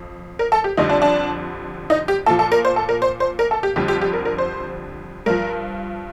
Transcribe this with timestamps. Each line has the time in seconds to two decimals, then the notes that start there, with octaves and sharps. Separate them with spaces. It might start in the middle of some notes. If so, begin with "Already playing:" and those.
Already playing: F2
0.39 A#4
0.52 A4
0.64 G4
0.77 F2 D3 G3 D#4
0.89 D4
1.02 D4
1.90 D#4
2.08 G4
2.26 A#2 F3 A4
2.39 A4
2.52 A#4
2.65 C5
2.76 A4
2.89 A#4
3.02 C5
3.20 C5
3.39 A#4
3.51 A4
3.63 G4
3.76 F2 D3 G3 G4
3.88 G4
4.01 G4
4.13 A#4
4.25 A#4
4.38 C5
5.26 G2 F3 A#4